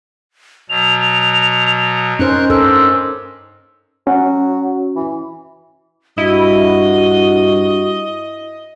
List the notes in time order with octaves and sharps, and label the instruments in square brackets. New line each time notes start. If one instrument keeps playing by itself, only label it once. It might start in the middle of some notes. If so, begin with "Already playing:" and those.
[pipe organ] B2 F#3 [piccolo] F7
[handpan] C#4 D#4 C5 [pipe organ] A#4 F#6
[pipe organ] G2 [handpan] A4 A#4 C5 [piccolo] E6
[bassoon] F#3 [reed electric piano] C#4 F#4
[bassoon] E3
[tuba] G2 [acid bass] E4 [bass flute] F#4 [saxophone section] D#5